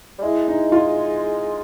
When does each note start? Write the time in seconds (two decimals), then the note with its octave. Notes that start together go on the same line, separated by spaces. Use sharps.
0.19 G3
0.22 G#3 E4
0.48 D#4
0.72 F4